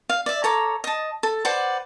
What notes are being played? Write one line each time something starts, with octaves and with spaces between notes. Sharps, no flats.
F5
D5 E5
A4 C#5 A#5 D6
D#5 A5
A4
B4 C5 D5 F#5